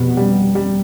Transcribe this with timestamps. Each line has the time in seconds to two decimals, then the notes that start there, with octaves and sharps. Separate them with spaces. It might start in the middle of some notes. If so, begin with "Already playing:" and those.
Already playing: F1 B2 B3
0.17 G3
0.55 G3